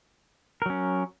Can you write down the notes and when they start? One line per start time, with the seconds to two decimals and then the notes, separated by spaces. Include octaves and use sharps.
0.62 A#4
0.66 F#3
0.70 C#4